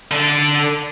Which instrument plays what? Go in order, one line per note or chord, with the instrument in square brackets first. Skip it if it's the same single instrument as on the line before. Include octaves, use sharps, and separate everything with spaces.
[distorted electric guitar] D3 A4